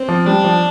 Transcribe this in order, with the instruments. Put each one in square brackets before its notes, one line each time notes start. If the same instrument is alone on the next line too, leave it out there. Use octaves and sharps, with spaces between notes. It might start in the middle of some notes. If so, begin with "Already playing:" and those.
Already playing: [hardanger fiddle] C4
[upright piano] F3
[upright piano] G3 [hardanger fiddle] D4
[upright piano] F3